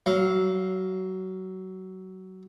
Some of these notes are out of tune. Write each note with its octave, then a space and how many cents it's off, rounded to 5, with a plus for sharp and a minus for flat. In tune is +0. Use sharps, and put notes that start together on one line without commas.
F#3 +20 F5 +0